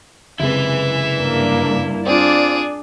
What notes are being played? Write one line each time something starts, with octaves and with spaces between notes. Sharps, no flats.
F#1 C3 G#3 E4 B4 E5
G2 A#3 D4
C4 D4 F4 G#4 D5